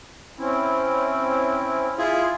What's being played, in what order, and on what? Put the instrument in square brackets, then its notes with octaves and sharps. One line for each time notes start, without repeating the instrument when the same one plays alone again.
[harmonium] C4 C#4 E4
[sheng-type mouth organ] E4 F4 G#4